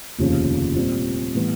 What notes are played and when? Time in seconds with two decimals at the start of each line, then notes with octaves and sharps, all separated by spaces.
0.18 F1 D#2 C#3 F3
0.76 A#2 G3 C4
1.34 A2 E3 G3 B3